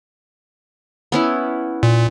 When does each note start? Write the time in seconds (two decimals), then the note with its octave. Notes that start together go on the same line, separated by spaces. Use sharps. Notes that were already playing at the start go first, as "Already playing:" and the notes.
1.12 B3 C#4 E4
1.83 A#2